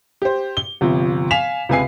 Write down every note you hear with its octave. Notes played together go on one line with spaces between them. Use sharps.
G4 C5
G7
G1 C3 F3
F5 G#5 B6 E7 F7
C#2 C3 B4 G#5 C7